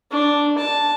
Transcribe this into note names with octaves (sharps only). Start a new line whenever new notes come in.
D4
A5